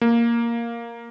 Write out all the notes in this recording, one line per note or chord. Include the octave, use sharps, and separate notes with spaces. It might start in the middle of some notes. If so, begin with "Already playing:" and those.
A#3